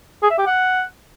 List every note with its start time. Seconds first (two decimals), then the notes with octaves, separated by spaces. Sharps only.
0.23 G#4
0.31 E5
0.38 G4
0.46 F#5